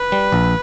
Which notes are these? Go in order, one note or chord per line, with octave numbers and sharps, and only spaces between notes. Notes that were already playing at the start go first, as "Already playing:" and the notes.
Already playing: B4
G3
A#1